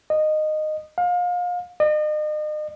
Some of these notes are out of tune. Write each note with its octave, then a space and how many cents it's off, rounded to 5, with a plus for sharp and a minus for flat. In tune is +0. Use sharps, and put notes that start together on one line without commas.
D#5 -15
F5 +30
D#5 -40